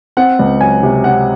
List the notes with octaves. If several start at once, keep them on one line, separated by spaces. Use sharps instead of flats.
C4 F#5
C#2
F#3 G#5
C3
C4 F#5